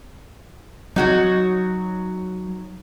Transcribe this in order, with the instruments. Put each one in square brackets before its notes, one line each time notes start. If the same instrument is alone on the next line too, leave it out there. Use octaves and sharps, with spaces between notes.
[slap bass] F#3 [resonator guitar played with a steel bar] D#4 F#4 C#5